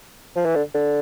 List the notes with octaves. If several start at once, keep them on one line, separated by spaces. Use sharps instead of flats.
F3
E3
D3
D3